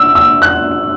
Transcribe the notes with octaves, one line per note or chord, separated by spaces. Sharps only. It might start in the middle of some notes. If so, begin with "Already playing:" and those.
Already playing: E6
E6
F#6